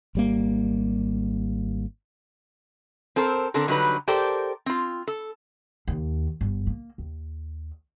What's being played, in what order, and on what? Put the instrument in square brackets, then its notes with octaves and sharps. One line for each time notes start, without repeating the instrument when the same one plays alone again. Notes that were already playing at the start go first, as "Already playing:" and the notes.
[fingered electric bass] G#1 G3 A#3
[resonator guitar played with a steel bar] C4 A4 A#4 C5
D3 C4 A4 A#4
D3 F#3 G3 D#4 F4 B4
G4 A4 A#4 C5 D5 G5
C4 F4
A4
[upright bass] D#2
G1
A#3
D#2